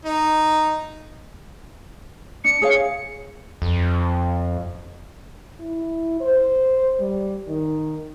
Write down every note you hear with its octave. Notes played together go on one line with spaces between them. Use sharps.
D#4
D4 C#7
G#4 C#5 F5
F2
E4
C5
G3
D#3